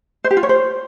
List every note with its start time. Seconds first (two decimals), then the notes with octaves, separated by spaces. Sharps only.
0.24 C5
0.31 G4
0.37 F4
0.43 C#5
0.49 C5